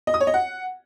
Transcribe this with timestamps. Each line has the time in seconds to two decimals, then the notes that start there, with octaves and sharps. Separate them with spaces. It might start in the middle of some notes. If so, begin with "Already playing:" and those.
0.07 D#5
0.14 D#6
0.21 C#5
0.27 D#5
0.34 F#5